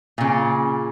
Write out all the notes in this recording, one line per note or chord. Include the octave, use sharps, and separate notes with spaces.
A#2 C#3